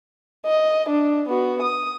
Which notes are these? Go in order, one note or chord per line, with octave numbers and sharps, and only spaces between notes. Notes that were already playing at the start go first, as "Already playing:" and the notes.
D#5
D4
B3 F#4
D#6